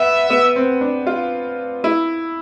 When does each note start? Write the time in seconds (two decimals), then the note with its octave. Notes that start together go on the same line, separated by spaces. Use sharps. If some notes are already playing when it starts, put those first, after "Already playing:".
Already playing: B3 E5
0.30 B3
0.56 C4
0.81 D4
1.07 F4
1.84 E4